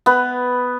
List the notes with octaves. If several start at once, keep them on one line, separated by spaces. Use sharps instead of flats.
B3 B4